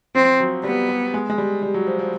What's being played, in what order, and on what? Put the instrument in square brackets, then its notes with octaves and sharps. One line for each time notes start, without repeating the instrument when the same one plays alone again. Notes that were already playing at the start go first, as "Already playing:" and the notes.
[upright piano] F3 [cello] C4
[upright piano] F#3
[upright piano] G3 [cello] B3
[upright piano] G3
G#3
G#3
G3
G3
F#3
F3
F3